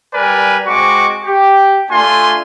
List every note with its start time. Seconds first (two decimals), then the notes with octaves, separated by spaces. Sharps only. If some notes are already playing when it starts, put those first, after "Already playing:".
0.13 G3 A#4 B4 D5 G#5
0.66 G#3 C4 F#4 C#6 D6
1.24 G4
1.90 A3 D4 F4 G#5 C6